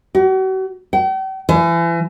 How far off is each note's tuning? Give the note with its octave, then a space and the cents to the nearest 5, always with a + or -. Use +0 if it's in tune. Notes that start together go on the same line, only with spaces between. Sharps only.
F#4 +40
G5 -40
E3 +35